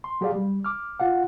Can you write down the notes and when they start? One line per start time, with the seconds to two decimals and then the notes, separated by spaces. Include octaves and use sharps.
0.04 C6
0.21 F#3 G4 G#4 D5 F5
0.35 G3
0.64 D6 F6
1.00 F4 F5 F#5